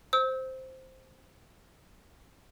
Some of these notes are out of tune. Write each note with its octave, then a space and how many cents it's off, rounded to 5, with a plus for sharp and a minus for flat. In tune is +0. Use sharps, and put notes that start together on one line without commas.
C5 +0 E6 -30